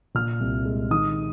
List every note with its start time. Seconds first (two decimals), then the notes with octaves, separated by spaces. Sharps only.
0.15 A#2 F6
0.40 C2
0.65 G#3
0.90 D#3 D#6